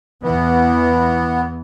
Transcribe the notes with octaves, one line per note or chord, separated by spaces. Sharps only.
E2 E3 B3